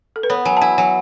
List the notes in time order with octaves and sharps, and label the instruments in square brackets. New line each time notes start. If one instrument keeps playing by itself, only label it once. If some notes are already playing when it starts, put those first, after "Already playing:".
[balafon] A4
B4
[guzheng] B3 [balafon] C#5
[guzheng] F#3 [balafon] G#5
[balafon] A5
[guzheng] E4 [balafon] G#5
[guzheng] F#3 [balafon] G#5